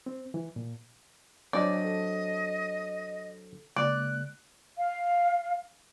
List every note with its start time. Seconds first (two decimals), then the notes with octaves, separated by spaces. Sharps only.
0.06 C4
0.34 E3
0.56 A#2
1.53 F#3 C4 D4 D5 D#5 G#5
1.84 A4
3.76 C#3 G#3 A#3 D5 F#6
4.77 F5